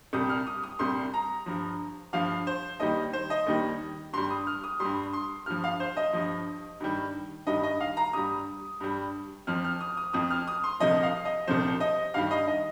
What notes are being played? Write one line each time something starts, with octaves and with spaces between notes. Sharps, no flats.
C2 C3 G3 D#6
F6
D#6
D#6
C2 C3 G3 C6
A#5
G2 F3
G2 F3 F5
C5
D#2 D#3 G3 D#5
C5
D#5
D#2 D#3 G3
G2 G3 C6
D#6
F6
D#6
G2 G3 C6
C6
G2 F3 F6
F5
C5
D#5
G2 F3
G2 D#3 G3
G2 D#3 G3 D#5
D#5
F5
A#5
G2 G3 D#6
G2 G3
F2 F3 F6
F6
D#6
D#6
F2 F3 D#6
F6
D#6
C6
C2 C3 F3 D#5
F5
D#5
C2 C3 F3 C5
D#5
G2 D#3 G3 F5
D#5
D#5